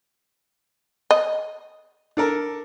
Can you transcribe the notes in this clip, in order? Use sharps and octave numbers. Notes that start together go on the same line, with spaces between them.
D#5
D4 A4 A#4